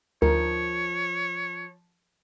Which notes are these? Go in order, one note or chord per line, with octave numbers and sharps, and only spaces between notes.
D2 F3 A#4 C#5